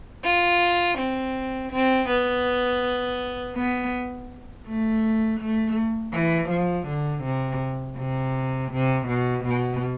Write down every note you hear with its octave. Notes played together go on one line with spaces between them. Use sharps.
F4
C4
C4
B3
B3
A3
A3
E3
F3
D3
C3
C3
C3
B2
B2